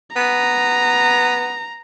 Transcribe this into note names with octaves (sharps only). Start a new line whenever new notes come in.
B3 A#5